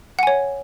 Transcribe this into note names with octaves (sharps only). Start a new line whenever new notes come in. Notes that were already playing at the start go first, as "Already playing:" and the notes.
C#5 F#5 G#5